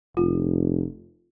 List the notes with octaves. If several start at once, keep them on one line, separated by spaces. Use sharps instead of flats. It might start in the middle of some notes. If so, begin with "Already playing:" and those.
F1 F4